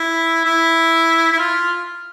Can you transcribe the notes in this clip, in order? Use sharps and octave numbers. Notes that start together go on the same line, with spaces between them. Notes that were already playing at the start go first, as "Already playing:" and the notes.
Already playing: E4
E4
E4
F4